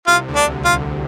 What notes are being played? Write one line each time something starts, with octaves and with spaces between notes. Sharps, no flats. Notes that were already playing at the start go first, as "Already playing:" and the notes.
C2 C3 F4
D2 D3
D4
F4
D2 D3